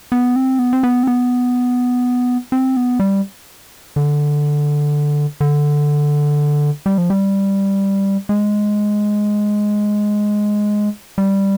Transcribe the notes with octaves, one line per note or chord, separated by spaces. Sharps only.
B3
C4
B3
C4
B3
C4
B3
C4
B3
G3
D3
D3
G3
F3
G3
G#3
G3